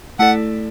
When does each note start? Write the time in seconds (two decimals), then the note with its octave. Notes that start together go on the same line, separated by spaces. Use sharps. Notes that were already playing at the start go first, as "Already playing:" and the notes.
0.19 A3 E4 A4 D5 F#5